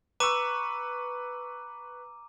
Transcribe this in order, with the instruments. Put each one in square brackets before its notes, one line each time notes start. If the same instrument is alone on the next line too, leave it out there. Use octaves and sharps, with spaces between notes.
[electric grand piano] B4 C#6 E6 [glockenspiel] A#5 D6 D#7